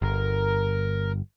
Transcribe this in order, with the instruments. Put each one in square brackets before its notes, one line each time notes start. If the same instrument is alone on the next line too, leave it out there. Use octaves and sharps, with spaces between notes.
[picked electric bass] G1 [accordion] A#4